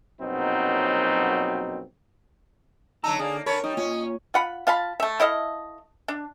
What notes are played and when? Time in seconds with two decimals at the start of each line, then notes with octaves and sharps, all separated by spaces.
0.20 A#1 F#2 B2 F#3 C4 D#4
3.04 D3 F#3 D#4 A5 A#5 E6
3.19 D3 A#3 G#4 D5 A5
3.46 D3 C#4 A#4 C#5 A5 B5
3.64 G3 D#4 D#5
3.77 A#3 C#4 F4
4.34 F4 F#5 B5
4.67 F4 F5 A5 B5
5.00 A3 E5
5.20 E4 A4 D#5 F5
6.08 D4